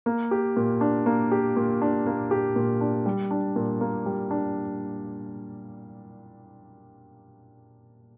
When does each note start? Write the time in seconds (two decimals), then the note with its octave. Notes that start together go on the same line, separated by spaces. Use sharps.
0.06 A#3
0.31 G4
0.57 A#2
0.81 D4
1.06 A#3
1.32 G4
1.57 A#2
1.82 D4
2.06 A#3
2.31 G4
2.56 A#2
2.81 D4
3.06 G3
3.31 D4
3.56 A#2
3.81 A#3
4.06 G3
4.31 D4